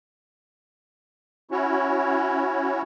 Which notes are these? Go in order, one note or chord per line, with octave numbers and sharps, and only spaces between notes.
C#4 E4 F#4 C#5